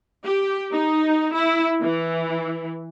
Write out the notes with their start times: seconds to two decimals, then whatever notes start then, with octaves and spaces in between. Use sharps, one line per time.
0.24 G4
0.72 D#4
1.34 E4
1.81 E3